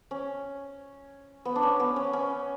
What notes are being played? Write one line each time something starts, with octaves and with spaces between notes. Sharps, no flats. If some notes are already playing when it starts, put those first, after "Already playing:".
C#4
B3
D4
C#4
B3
C#4
C#4